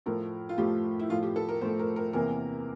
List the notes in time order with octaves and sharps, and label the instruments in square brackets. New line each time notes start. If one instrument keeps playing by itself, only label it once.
[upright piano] A2 F3 A3 [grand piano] A#4
[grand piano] F4
[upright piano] A2 F3 A3 [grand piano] G4
[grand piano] E4
[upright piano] A2 F3 A3 [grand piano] F4
[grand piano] G4
A4
A#4
[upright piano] A2 F3 A3 [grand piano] C5
[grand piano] A#4
A#4
[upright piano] E2 C3 E3 A#3 [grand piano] A#4